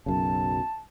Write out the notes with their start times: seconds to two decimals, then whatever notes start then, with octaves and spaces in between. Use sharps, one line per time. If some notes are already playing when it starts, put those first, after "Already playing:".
0.06 B1 F#2 C#3 A5